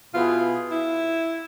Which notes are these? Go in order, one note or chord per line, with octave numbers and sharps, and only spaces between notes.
B2 B3 E4 F4 G#4
E4